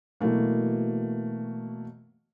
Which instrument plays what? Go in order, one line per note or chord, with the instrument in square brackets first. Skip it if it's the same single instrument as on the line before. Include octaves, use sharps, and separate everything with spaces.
[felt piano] B2 E3 F#3 A3 A#3